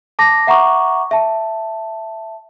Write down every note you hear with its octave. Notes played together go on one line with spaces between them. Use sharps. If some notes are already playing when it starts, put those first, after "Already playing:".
A5 D6 A#6
E5 F#5 A#5 C#6 D6
E5 A5